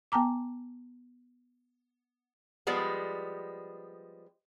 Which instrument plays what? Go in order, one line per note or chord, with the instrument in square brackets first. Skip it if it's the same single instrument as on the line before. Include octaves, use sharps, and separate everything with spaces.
[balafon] B3 G5 A5 A#5 D6
[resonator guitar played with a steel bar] F3 G3 G#3 B3